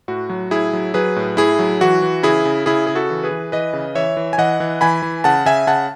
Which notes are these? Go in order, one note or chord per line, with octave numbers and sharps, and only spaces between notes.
A2 F#4
F#3
A2 E4 G#4
F#3
F#3 G#4 B4
A2
A2 E4 G#4
F#3
E3 F#4
E3
C#3 E4 G#4
C#3
C#3 E4 G#4
C#3 G#4
F#4 A4
E3
G#4 B4
E3
E3 B4 D#5
C#3
E3 C#5 E5
E3
G#5
E3 D#5 F#5
E3
E3 G#5 B5
E3
C#3 F#5 A5
C#3 E5 G#5
C#3 F#5 A5